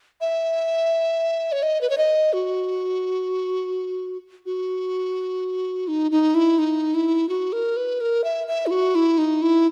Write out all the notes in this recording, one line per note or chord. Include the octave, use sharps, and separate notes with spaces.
E5
C#5
D#5
B4
C#5
D#5
F#4
F#4
D#4
D#4
E4
D#4
E4
F#4
A#4
B4
A#4
E5
E5
E4
F#4
E4
D#4
E4